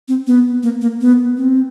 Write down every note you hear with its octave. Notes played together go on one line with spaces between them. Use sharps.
C4
B3
A#3
A#3
B3
C4